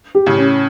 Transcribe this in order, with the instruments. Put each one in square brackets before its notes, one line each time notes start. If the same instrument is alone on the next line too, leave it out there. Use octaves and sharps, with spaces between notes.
[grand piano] G4
[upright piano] A2 C#3
[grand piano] C#4